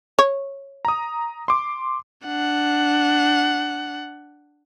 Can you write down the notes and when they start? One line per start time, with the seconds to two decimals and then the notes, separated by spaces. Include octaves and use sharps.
0.19 C#5
0.85 A#5 D#6
1.48 C6 D6
2.27 D4 F#5